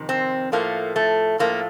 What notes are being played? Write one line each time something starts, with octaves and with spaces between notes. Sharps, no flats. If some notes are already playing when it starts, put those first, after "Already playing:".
Already playing: F2 C3 D#3
C4
A2 F3 A3 A#3
A3
A2 F3 A3 A#3